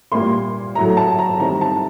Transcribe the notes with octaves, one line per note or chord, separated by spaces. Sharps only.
A#2 G3 A#3 C6
A2 F#3 A3 A#5
A5
A#5
D#3 G3 C4 A#5
A5